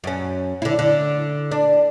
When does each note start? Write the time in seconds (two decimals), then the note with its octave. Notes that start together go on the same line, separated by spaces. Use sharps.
0.04 F#2 C#4
0.62 D3 E4
0.79 D3
1.51 D4